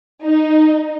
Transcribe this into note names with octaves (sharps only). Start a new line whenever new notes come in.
D#4